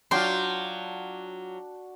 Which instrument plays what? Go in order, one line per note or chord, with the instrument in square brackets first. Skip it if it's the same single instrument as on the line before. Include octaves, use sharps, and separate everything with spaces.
[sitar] F#3 F4 [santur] D4 F#4 [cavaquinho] G5 C6